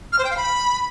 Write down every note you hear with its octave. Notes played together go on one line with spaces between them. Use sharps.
F6
C5
G5
F5
B5